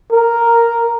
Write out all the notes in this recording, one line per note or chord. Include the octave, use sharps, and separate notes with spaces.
A#4